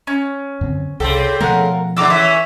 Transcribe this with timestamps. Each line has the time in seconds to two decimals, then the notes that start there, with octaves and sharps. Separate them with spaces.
0.07 C#4
0.61 F#2 D3 C4
1.00 C2 C#3 C4 G4 A4
1.41 B2 F3 A3 A#4 F5 F#5
1.96 E2 D3 A#5 D6 E6
2.10 E3 A#3 C#4 E5